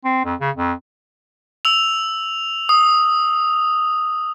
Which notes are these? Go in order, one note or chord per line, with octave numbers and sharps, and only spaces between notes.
C4
F2
C#3
F2
E6 F7
D#6